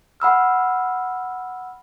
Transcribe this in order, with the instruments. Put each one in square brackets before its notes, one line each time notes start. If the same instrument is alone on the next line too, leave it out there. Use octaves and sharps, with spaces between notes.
[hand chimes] F#5 B5 E6 F6